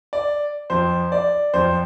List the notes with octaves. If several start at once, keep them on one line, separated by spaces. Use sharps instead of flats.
D5
F2 F3 C5
D5
F2 F3 C5